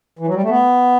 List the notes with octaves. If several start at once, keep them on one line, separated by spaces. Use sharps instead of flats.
E3
F#3
G3
A3
B3